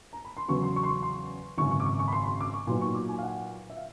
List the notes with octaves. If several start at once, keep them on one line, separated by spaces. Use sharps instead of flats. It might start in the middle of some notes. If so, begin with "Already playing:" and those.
A#5
B5
C6
E2 C#3 F#3 B3 C#6
C6
C#6
C6
C#6
C6
G#1 F#2 C#3 C#6
C#6
D6
C#6
C#6
B5
C6
C6
D6
C#6
A#2 F#3 B3 D#4 C6
C#6
D6
G#5
F5
F#5
E5
F5